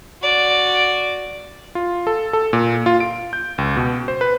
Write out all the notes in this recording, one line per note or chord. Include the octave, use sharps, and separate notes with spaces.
F#4 D5
F4
A4
A4
A#2
F4
D7
G6
C#2
B2
C5
B4